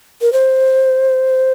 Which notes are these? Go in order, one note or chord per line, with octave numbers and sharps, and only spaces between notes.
A#4
C5